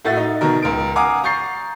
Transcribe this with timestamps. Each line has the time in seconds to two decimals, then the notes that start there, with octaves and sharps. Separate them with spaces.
0.05 A2 A3 F#4 A6
0.16 D#4
0.41 B2 D#3 A#4
0.63 C#2 A#4 D7
0.96 F5 F#5 G#5 A#5 D6 D#6
1.23 A#5 C#6 G6 A6 C7